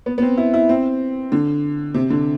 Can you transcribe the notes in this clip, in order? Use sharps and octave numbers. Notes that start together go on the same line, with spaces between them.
B3
B3
C4
E4
E4
C4
D3
C3
D3